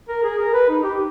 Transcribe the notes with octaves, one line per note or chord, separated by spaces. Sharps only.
A#4
G#4
A#4
B4
D#4
G4